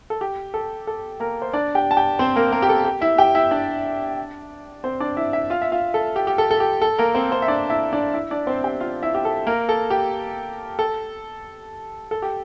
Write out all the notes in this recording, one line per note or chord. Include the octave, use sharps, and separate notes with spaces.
A4
G4
A4
A4
A#3 A#4
C5
D4 D5
G4 G5
A5
G4 G5
C4 C5
A#3 A#4
A#3 A#4
G4
A4
G4
E4 E5
G4 G5
E4 E5
D4 D5
C4 C5
D4 D5
E4 E5
E4 E5
F4 F5
E5
F4 F5
A4
G4
G4
A4
A4
G4
A4
A#3 A#4
C4 C5
C4 C5
E5
D4 D5
E4 E5
D4 D5
E4 E5
D4 D5
C4 C5
G4 G5
F4 F5
E4 E5
G4
A4
A#3 A#4
A4
G4
A4
A4
G4